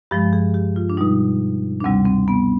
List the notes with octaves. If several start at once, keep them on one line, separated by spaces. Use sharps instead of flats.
G2 F3 G#3 G4
G#4
G4
F4
D4
B2 G3 D#4
D4
D2 C3 G3 C4
C4
B3